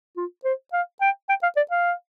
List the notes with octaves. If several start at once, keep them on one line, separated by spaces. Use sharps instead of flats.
F4
C5
F5
G5
G5
F5
D5
F5